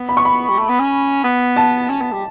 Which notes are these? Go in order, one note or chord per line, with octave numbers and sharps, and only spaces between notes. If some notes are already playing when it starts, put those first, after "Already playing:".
Already playing: B3
B5
C#6
B5
G3
A3
B3
C#4
B3
A5
C#4
B3
G3